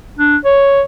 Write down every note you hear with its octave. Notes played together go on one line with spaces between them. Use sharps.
D4
C#5